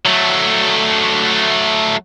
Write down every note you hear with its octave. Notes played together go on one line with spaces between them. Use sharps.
F#3 A3